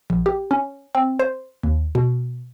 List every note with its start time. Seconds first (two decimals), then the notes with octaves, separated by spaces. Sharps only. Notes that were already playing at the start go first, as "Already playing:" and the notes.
0.10 A#1
0.26 G4
0.51 C#4
0.95 C4
1.19 C5
1.63 D#2
1.95 B2